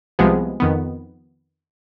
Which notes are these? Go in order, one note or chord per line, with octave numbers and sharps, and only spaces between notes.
C2 C3 F3 G#3 B3 G#4
F2 D#3 B3